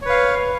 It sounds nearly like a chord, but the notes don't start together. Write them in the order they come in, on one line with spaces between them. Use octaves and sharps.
C#5 B4 F5